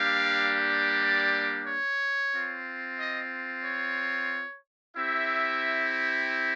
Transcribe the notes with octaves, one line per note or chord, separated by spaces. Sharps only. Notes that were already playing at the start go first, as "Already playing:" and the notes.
Already playing: G3 A#3 D4 G4 F5
D5
C#5
C4 F4
D#5
C#5
C4 E4 G4 E5